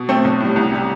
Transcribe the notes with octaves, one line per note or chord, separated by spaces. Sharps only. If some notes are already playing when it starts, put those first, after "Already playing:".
Already playing: B2
A3 C4
B1
A2 G3
C2
C3 G3